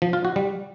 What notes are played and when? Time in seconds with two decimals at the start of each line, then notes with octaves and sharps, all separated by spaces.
0.02 F3
0.13 F4
0.25 F#4
0.36 G3